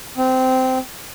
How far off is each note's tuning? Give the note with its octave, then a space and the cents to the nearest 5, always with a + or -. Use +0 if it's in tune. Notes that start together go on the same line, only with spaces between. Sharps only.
C4 -15